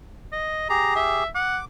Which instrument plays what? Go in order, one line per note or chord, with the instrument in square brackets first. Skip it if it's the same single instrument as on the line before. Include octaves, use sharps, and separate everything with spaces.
[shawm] D#5
[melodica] G4 G#4 [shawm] A#5
[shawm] E5
[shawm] F#5 [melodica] D6